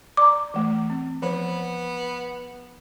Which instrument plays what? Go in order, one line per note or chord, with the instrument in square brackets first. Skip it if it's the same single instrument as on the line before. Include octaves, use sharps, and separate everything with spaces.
[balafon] D5 A#5 [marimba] D6
[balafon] E3 A3
C4
[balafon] F3 C5 [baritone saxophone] B3